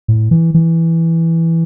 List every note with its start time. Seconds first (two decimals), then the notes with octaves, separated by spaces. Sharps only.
0.08 A2
0.31 E3
0.54 E3